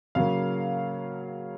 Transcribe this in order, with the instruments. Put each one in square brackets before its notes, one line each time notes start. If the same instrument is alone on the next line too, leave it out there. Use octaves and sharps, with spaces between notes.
[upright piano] C#3 F#3 A#3 F5